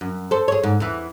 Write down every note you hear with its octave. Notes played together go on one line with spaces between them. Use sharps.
F#2
A4 C5
G#4 C#5
G#2
E2 E3